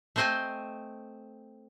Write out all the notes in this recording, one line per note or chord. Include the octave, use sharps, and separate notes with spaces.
A3 C4 C5 D#5 G5 G#5